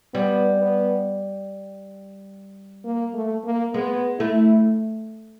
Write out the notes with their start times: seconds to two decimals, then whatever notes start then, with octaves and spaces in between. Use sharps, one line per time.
0.14 G3 B3
0.59 B3
2.85 A#3
3.14 A3
3.44 A#3
3.74 G#3 B3
4.19 A3 E4